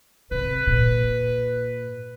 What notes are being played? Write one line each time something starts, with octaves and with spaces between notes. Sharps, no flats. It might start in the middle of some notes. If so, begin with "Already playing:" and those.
C3 B4
A#2